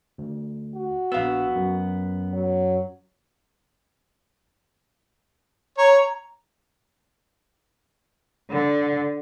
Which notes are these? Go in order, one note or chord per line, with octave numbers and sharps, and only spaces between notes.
D2
F#4
A#1 B3 F5 E6
F#2
F#3
C#5 A#5
D3